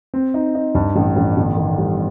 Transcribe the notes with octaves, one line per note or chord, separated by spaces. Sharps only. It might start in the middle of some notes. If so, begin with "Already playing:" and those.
C4
D#4
D#4
G2
A1
A1
G1
D#3
G3